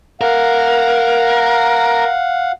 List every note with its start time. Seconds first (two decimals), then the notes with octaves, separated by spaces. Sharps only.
0.21 A#4 F5 F#5